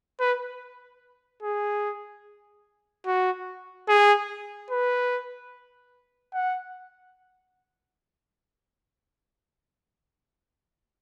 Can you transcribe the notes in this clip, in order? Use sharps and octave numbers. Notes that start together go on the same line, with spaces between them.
B4
G#4
F#4
G#4
B4
F#5